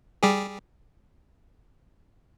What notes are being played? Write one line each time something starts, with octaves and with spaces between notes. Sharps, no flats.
G3 G4 G#4